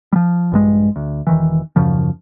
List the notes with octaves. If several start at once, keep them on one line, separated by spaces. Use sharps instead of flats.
F3 G3
A#1 G2 G#3
D2
E1 D#3 E3
D#1 F#2 C#3 F3